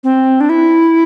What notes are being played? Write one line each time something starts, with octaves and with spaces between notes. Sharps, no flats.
C4
D4
E4